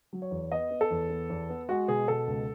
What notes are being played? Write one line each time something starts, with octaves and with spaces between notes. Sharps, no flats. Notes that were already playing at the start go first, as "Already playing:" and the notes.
F#3
C#5
E2
B3 D#5
B3
A4
E2
B3
E2
B3
G#3 F#4
B2 G#4
B2 A4
C#2